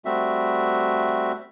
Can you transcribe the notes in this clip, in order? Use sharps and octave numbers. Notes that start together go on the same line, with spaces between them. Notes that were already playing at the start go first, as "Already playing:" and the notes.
G3 A3 C4 F#4 E5